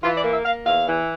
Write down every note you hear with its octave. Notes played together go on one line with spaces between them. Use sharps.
E3 F4
D5
A#3
E5
A#3 F5
E2 F5
E3